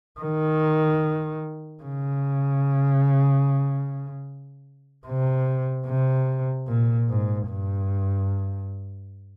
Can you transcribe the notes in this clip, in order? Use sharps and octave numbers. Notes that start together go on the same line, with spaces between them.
D#3
C#3
C3
C3
A#2
G#2
G2